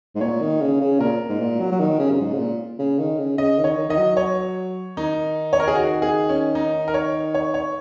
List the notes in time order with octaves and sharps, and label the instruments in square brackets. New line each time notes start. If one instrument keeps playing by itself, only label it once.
[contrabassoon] G#2
[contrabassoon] A#2 [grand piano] C#5
[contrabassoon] D#3
C#3
C#3
[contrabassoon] A#2 [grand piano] A#4
[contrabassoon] G#2
A#2
F#3
F#3
D#3
C#3
F#2
G#2
C#3
A#2
C#3
D#3
C#3
[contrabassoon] C#3 [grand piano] D#5
[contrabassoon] D#3
[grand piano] C#5
[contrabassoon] D#3
[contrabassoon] D#3 [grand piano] D#5
[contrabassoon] F#3
[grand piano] C#5
[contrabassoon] D#3 [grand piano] D#4
[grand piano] C#5
A#4
G#4
F#4
G#4
C#4
D#4
A#4
C#5
C#5
C#5